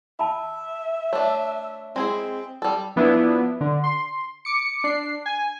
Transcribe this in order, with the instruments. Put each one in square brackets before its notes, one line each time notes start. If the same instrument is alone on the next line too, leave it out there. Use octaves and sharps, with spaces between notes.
[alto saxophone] E5 [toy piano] A5 B5
[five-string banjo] A3 D4 [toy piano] C#5
[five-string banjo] G#3 E4 G#4 [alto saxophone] C4
[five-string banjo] G3 A4
[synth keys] F3 B3 D4 E4
D3
C6
D6 C#7
D4 C7
G#5